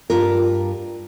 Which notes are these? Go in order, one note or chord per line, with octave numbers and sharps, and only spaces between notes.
G2 F4 A#4